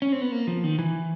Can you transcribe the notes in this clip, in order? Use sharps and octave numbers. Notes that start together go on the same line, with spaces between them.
C#4
C4
B3
A#3
F3
D#3
E3